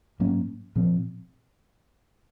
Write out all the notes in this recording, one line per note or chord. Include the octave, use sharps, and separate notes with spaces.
G#2 F#3 A#3 C#4
A#2 F3 C4